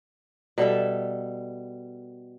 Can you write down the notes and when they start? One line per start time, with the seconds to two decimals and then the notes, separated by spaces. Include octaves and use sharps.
0.58 B2 G3 A4 E5